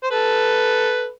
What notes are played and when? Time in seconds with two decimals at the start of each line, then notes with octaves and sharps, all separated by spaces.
0.03 C5
0.11 A4 B4